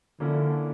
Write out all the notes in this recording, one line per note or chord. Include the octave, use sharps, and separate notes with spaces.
D3 F3 A#3 C#4 E4 A4